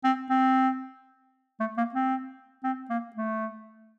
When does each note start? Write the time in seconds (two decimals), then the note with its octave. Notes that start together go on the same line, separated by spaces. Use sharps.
0.04 C4
0.30 C4
1.60 A3
1.77 A#3
1.94 C4
2.64 C4
2.90 A#3
3.16 A3